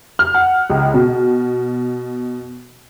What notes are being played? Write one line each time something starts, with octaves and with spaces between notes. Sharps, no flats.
F6
F#5
C#2
B2